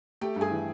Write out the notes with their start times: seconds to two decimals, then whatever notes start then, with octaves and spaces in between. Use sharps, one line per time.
0.21 A3 G4 G5
0.36 G2
0.41 G#4 G#5
0.51 E3